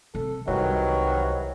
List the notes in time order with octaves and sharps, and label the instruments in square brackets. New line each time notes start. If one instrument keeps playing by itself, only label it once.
[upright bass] C3 [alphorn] A4
[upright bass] C2 [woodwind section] C3 E3 F#3 [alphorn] D#3